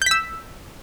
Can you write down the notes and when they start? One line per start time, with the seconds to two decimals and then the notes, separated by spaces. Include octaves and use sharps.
0.02 G6
0.06 B6
0.11 E6